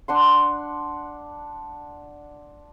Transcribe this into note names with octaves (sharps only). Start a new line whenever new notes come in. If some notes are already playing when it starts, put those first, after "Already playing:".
D4 F#5 C6